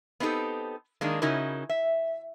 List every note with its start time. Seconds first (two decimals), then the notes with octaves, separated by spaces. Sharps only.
0.20 B3 C4 D#4 G4 A4
1.01 D#3 G#3 A#3 D4
1.22 C#3 C#4 D#4 E4 F#4 A#4
1.69 E5